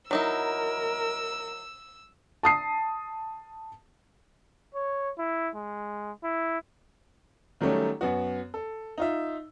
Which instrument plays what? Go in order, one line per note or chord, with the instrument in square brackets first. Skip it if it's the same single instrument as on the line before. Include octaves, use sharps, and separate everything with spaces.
[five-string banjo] F#3 D#4 E4 [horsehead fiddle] A#4 [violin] E6
[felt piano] A5 D#6 C7
[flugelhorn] C#5
E4
G#3
E4
[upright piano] D#3 F#3 G3 A3 C#4
F#2 B3 F#4
A4
D#4 F4 E5